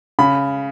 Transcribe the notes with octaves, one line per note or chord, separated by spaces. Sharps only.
C#3 B5